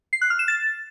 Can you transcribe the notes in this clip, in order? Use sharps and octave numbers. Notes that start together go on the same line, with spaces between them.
C7
F#6
F6
E7
A6